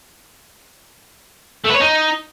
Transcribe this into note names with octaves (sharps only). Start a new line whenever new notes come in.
A3
B4
C#5
D#4